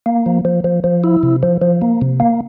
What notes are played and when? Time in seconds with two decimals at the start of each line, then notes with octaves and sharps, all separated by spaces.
0.06 A#3
0.26 F3
0.45 F3
0.64 F3
0.84 F3
1.04 E4
1.23 C3
1.43 F3
1.62 F3
1.82 A#3
2.02 C3
2.20 A#3